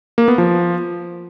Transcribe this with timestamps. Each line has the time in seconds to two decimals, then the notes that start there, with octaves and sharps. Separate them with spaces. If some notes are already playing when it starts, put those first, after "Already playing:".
0.18 A#3
0.28 B3
0.38 F3